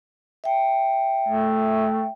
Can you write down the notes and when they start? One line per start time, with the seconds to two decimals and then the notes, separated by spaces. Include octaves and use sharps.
0.44 E5 G5
1.28 A3